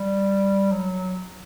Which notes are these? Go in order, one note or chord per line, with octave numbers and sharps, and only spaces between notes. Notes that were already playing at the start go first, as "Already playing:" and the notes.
Already playing: G3
F#3